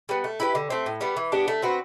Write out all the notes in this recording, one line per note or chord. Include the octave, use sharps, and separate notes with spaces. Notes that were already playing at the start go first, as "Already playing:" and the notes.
G3 B3
A3
E4 G4 B4
D3
A3 C4
A2
G3 B3
E3
B3 D4 G4
A3
C4 F#4 B4